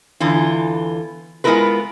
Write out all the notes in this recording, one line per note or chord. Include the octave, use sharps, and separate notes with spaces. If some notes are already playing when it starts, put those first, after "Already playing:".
E2 D3 E3 F4
G#3 B3 E4 F4 A#4 B4